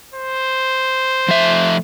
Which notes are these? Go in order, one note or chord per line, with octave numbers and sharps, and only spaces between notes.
C5
F3 A3 E5